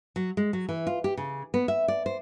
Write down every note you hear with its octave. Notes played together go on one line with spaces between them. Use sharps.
F#3
G#3
F#3
E3
F4
G4
C#3
B3
E5
D5
C5